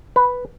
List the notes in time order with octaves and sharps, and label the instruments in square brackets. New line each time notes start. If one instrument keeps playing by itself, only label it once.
[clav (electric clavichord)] B4